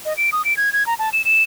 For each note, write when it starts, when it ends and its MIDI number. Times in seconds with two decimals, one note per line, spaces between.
0.05 0.16 75
0.17 0.30 98
0.32 0.45 87
0.45 0.56 98
0.57 0.72 92
0.73 0.86 92
0.87 0.94 82
0.99 1.10 81
1.13 1.22 100
1.25 1.43 100